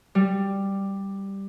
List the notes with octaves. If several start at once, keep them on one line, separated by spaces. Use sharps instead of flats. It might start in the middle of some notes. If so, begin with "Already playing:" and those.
G3